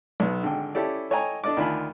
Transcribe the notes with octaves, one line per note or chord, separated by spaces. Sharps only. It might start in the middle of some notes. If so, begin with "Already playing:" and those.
B1 B3
G#1 D3 G5
C#4 E4 G4 A4 D5
A4 C#5 D#5 G5 G#5 A#5
D4 A4 D5 D#5 D6
D2 D#3 D4 F4 G#5 B5